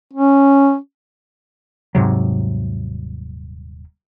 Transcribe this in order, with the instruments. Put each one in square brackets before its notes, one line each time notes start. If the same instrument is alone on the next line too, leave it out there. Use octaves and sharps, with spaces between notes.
[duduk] C#4
[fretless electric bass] D#1 G#2 C3 F#3